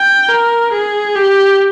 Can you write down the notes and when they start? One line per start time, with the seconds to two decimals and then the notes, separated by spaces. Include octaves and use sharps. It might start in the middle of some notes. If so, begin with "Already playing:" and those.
Already playing: G5
0.29 A#4
0.72 G#4
1.15 G4